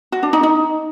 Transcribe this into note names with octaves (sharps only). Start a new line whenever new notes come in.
F#4
D4
D#4
D#4